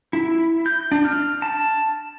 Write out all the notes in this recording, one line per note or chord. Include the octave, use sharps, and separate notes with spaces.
E4
G6
D4
F6
A5